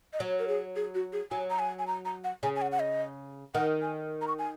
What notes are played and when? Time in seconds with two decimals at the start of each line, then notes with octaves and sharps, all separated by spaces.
0.13 D#5
0.20 F#3 C#5
0.39 A#4
0.48 G#4
0.76 G#4
0.95 F#4
1.13 G#4
1.31 F#3 G#5
1.50 A#5
1.59 G#5
1.79 G#5
1.87 A#5
2.05 A#5
2.24 F#5
2.43 C#3 G#5
2.56 G#5
2.62 F#5
2.72 F#5
2.80 D#5
3.54 D#3 F#5
3.82 G#5
4.22 A#5
4.28 C#6
4.39 G#5